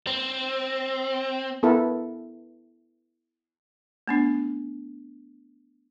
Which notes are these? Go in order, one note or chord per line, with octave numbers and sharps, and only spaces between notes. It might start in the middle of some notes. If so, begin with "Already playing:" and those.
C4
B3 E4 A4 A#4
A3 B3 D4